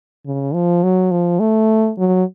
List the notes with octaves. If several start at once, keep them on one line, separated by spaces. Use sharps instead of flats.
C#3
F3
F#3
F3
A3
F#3